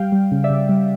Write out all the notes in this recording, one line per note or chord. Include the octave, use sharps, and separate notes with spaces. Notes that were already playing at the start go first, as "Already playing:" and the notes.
Already playing: G3 F5 G5
G3
C#3
D5 E5
C#3
G3